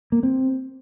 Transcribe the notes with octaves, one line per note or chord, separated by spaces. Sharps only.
A#3
C4